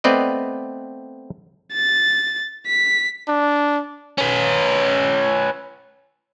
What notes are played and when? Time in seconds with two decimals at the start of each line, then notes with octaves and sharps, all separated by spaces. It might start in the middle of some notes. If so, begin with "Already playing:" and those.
0.04 A3 B3 C4 B4 D5 D#5
1.73 A6
2.67 B6
3.28 D4
4.18 C#4 B4